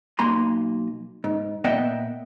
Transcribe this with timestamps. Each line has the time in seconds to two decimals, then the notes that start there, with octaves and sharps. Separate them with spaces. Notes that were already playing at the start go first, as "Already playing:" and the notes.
0.19 B1 A#3 G#5 A#5 C6
1.24 G#2
1.64 A#2 B3 D#5 E5 F#5 G5